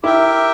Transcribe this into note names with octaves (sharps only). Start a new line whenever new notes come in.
E4 G4 A#4 E5 G5